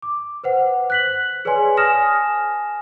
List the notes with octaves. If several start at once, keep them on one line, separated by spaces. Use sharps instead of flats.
D6
B4 C5 F#5
F#6 B6 F#7
G#4 B4 C#5 D5 G#5 C6
G#5 A5 D#6 F6 A#6 E7